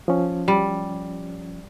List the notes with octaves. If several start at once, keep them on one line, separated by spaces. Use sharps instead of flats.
F3 C#4
G3